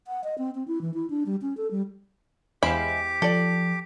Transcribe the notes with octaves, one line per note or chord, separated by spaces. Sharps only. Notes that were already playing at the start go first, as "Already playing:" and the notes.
F#5
D#5
C4
C4
E4
E3
E4
D4
G3
C#4
A4
G3
E2 G#3 E4 G4 C5 F5 B5 D6
F3 A4 D5